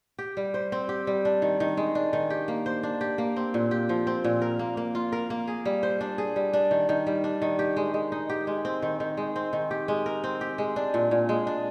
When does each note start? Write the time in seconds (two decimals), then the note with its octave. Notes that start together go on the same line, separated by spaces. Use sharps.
0.19 G4
0.37 G3
0.54 C5
0.72 C4
0.89 G4
1.07 G3
1.25 D4
1.42 D#3
1.60 D#3
1.77 G#3
1.95 D4
2.13 D#3
2.30 G4
2.48 A#3
2.66 C5
2.83 D4
3.01 G4
3.18 A#3
3.36 C4
3.54 A#2
3.71 G4
3.89 F3
4.07 C4
4.24 A#2
4.42 A#4
4.59 A#3
4.77 A#3
4.95 F4
5.12 A#4
5.30 A#3
5.47 G#4
5.65 G3
5.83 C5
6.01 D4
6.18 G#4
6.36 G3
6.53 D4
6.71 D#3
6.89 D#3
7.07 G3
7.24 D4
7.42 D#3
7.59 G4
7.76 G#3
7.94 G#3
8.12 D#4
8.30 G4
8.47 G#3
8.65 C4
8.82 D#3
9.00 D#3
9.17 G#3
9.36 C4
9.53 D#3
9.71 G4
9.88 G#3
10.06 A#4
10.24 C4
10.41 G4
10.58 G#3
10.76 D4
10.94 A#2
11.11 A#2
11.29 G#3
11.47 D4